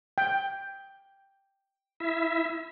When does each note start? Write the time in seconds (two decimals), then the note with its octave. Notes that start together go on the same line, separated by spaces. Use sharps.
0.18 G5
2.00 E4 E5